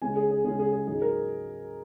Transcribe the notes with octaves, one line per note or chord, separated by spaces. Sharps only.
C#3 G#3 C#4 G#5
G#4
G#4
C#3 G#3 C#4 G#4
G#4
G#4
G#2 F#3 D#4 G#4
A#4